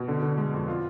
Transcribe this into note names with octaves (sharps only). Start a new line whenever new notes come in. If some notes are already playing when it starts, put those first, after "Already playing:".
Already playing: B2
D3
D3
G#3
F2
F4